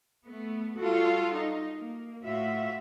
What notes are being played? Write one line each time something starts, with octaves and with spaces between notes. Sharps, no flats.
A3 B3
G3 F4 F#4 A4
D#4
A#3
A2 F4 F#4 E5